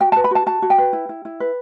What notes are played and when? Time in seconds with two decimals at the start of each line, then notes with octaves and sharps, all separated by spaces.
0.01 F#4 G5
0.12 B4 A5
0.24 B5
0.31 F#4 A5
0.46 F#4 A5
0.62 F#4
0.70 G5
0.78 B4
0.93 E4
1.09 E4
1.25 E4
1.40 B4